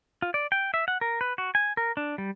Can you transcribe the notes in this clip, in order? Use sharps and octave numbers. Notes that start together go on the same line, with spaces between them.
F4
D5
G5
E5
F#5
A#4
B4
F#4
G#5
A#4
D4
G3